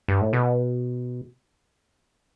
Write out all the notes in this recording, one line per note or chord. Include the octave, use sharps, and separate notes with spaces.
G2
A2
B2